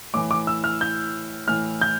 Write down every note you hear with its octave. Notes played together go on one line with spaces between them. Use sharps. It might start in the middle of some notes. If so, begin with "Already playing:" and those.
A2 E3 D6
D6
E6
F6
G6
A2 E3 F6
G6